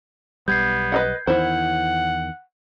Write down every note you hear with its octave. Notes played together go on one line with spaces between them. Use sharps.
B1 G3 B3 G6 G#6 C7
B4 D#5 F#5
E2 D#3 E4 C5 F#5